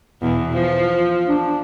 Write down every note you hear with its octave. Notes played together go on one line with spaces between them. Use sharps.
E2 B2
F3
D4